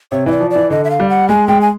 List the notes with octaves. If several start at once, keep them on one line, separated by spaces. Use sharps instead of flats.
C3 C#5
E3 D5 D#5
F3
D5
E3
D3 D#5
E5
F5
G3
F#5
G#3 G#5
G#3 G5
G#5